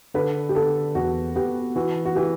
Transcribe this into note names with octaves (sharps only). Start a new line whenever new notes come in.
D3 B4
G4
D3 A4
E2 F#4
B3 G4
E3 F#4
F#4
E3 G4